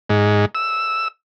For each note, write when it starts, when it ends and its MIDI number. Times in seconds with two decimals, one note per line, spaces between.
0.10 0.45 44
0.55 1.08 88